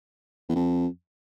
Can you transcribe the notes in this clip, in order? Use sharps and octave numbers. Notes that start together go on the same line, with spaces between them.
E2
F2